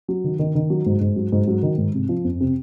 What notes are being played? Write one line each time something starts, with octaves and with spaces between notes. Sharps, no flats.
F#3
D#3
D#3
D#3
F#3
G#2
G#2
F#3
G#2
F#3
D#3
G#2
C3
F3
F2
C3